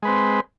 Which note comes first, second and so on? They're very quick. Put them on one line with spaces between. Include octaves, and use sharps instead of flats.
G#3 B4 C4